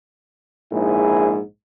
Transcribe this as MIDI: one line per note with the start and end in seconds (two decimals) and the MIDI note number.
0.72 1.39 34
0.72 1.39 44
0.72 1.39 64
0.72 1.39 68